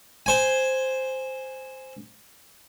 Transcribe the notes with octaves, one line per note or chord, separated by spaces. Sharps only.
C5 G#5